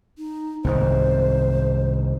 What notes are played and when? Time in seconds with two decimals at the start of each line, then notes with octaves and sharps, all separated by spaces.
0.18 D#4
0.64 C2 G#2 D#3 C5